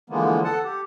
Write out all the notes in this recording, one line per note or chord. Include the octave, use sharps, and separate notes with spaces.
D3 E3 F3 G#3 A#3 B3
A4 F#5 A5
G4